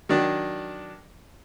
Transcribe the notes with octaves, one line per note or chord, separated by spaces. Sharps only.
D#3 F#3 D4